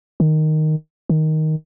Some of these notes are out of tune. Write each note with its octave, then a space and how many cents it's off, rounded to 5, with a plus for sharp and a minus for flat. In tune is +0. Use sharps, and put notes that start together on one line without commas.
D#3 -5
D#3 +5